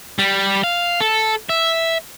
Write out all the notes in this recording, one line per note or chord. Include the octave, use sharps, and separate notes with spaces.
G3
F5
A4
E5